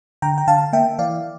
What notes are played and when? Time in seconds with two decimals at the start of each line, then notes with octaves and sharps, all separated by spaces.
0.22 D3 G5 A#5
0.38 G5
0.47 D3 F5 A5
0.73 A#3 E5 G5
0.99 E3 D5 F5